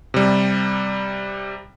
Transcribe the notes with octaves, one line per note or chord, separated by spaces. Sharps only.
C3 G3